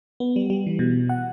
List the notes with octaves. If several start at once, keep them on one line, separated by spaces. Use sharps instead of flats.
B3
G3
G3
E3
B2
F#5